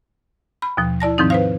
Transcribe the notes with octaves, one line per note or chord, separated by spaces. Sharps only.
B5
D#2 B2 F3
E4 D5 A5 A#6
G#2 D#3 F3 C4 D#4
B4 C5 F5